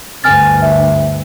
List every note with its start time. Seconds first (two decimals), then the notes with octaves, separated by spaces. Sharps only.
0.24 D2 G2 G#5 F6 A6
0.62 E5